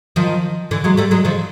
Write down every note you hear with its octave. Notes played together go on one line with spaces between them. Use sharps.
D#3 F3
D3 E3
F#3 G#3
G3 A3
F#3 G#3
D#3 F3